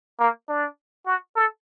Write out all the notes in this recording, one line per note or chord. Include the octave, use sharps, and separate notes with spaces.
A#3
D4
F#4
A4